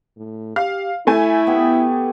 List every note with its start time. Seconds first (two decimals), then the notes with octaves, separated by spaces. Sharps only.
0.17 A2
0.56 G4 F5
1.07 A3 E4 G#5
1.47 B3 G4